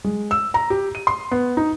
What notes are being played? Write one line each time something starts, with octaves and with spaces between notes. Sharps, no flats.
G#3
E6
A#5
G4
D#7
C6
B3
D#4